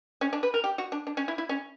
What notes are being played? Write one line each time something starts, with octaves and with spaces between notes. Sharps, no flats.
C#4
D4
B4
A#4
G4
F#4
D4
D4
C#4
E4
E4
C#4